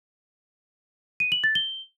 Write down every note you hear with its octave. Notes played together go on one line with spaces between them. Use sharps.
D#7
F#7
A6
G7